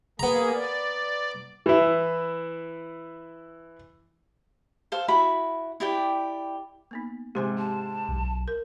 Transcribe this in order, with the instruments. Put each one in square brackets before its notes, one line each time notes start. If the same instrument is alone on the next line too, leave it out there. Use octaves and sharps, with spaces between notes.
[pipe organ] A#3 G#4 [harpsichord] B3 A#5
[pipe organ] D5
[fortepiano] E3 E4
[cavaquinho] A4 C5 F5
E4 F#4 B5
E4 G4 D5 G5
[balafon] A#3 B3 D#4
[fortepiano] G#2 C3 [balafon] G4 C5 G#5
[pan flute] A5
[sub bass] B1
[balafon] A#4